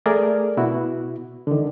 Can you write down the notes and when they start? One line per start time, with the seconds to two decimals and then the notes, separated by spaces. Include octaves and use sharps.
0.06 A3 G#4 A#4 D5
0.57 B2 E4 F#4
1.47 D3 D#3